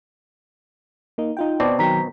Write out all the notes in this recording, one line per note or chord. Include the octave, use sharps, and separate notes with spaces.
A#3 D#4
D#4 F4 G5
B2 C4 D5 A5 D6
D#3 F#3 G5 A#5 B6